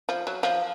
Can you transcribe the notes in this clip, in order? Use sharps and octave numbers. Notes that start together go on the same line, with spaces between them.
F3
F#3
F3